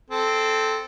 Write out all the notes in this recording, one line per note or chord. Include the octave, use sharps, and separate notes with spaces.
C4 A4